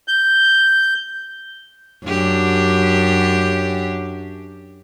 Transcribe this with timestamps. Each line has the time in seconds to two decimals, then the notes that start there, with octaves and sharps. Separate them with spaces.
0.08 G6
2.05 F#2 D4 G4